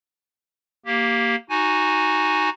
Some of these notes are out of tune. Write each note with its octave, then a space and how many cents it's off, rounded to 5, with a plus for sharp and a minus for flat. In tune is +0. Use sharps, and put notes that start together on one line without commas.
A#3 +0 G4 +0
D#4 +0 F#4 +0 G#5 +0